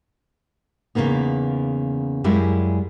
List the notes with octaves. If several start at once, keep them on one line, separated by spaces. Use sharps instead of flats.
E2 C#3 F3 A#3 B3 D#4
F#2 G3 G#3 E4 F4